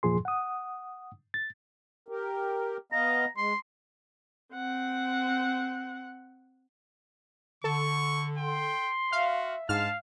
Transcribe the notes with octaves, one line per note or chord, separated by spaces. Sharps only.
E2 A#2 F3 G#4 C6
F#5 D#6
A6
G4 A#4
B3 D#5 F5 A#5
G#3 C6
C4 F#5
D3 A4 C#6
G5 C6
F#4 E5 F5
G#2 G#3 D4 F5 A5 F6